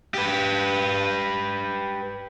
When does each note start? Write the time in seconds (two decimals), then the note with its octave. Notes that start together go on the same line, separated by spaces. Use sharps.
0.14 G4 B4